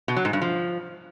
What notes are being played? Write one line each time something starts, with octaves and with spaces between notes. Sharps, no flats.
B2
F#3
G#2
G2
F3